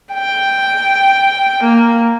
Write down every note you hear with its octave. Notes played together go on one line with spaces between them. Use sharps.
G5
A#3